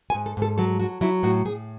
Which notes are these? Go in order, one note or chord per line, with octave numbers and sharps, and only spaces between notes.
G#5
G#2
A4
G#2 A4
F#3 A4
F#3 F#4
F#3 E4
A2 F#4
A2 G#4